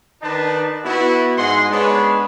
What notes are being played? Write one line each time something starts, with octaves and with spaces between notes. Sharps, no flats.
D#3 D4 D#4 B4 A5
B3 E4 F#4
G#2 D#5 F#5 G#5 C6
G#3 B3 D4 G#4 B4 C#5